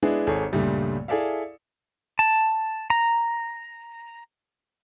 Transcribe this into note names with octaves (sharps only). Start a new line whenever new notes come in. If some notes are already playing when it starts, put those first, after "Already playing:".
G#3 B3 D4 E4 G#4
G#1 G#4 A4 C#5
C#2 G2 A#2 C#3 G3 A3
E4 G#4 A4 D5 E5 F5
A5
A#5